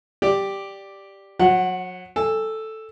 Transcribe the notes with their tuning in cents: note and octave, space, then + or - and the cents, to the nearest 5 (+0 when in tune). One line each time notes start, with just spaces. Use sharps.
G4 +0 D5 +0
F#3 -35 F#5 +0
A4 +0 G#5 -25